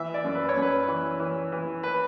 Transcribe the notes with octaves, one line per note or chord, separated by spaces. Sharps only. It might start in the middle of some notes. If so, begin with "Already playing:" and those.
Already playing: E3 E5
D5
F#2
B4
C#5
F#2
B4
E3
E3
E3
B4